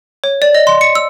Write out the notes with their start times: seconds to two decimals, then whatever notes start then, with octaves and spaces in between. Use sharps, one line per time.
0.24 C#5
0.42 D5
0.55 D#5
0.67 C6
0.81 C#7
0.95 E6